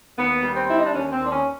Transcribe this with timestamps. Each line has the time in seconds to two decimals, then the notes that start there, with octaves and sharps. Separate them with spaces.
0.18 D#2 B3
0.43 G3
0.55 C4
0.69 D3 E4
0.79 D#4
0.86 D4
0.93 D#2 C#4
1.12 C4
1.18 D#2
1.26 D4
1.32 C#4